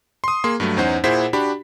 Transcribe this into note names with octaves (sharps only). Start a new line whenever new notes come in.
C6 D#6
A#3 G#4 C6
G2 F#3 A3
E2 C#4 D#4 C5 F#5
A#2 E4 G#4 C5 F#5 B6
D4 F#4 G4 B5